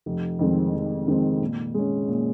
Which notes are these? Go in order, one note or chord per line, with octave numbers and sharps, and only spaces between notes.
F1
F2 D#3 G#3 C4
F1
F2 D#3 G#3 C4
A#2
G#3 C#4
A#2